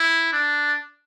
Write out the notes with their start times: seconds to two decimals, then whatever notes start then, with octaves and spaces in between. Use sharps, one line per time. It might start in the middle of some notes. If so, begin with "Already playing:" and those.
Already playing: E4
0.33 D4